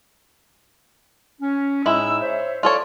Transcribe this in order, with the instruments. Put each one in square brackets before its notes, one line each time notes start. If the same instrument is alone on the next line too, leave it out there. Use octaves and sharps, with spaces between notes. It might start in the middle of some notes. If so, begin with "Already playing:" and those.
[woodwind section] C#4
[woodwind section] A2 D#4 E6 [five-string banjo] G#3 E4
[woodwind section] C5 C#5 E5
[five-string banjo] F4 A4 C#5 [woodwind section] D5